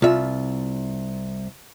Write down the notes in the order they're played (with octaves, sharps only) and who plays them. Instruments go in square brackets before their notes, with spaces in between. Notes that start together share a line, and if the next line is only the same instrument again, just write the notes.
[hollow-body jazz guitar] C2 E5 [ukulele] F4